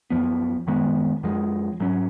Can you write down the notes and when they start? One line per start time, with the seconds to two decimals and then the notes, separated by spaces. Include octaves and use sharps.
0.10 F#2 F3 B3
0.67 F#2 D#3 G#3 B3
1.23 F#2 F3 G#3
1.80 G#2 F#3 C#4